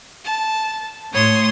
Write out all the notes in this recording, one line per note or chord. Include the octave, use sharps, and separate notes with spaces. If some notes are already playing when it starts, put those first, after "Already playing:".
A5
A2 C#5 C6 D#6